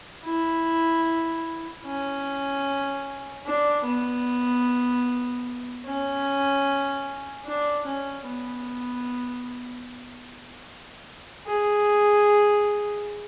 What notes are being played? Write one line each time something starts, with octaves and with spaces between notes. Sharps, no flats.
E4
C#4
D4
B3
C#4
D4
C#4
B3
G#4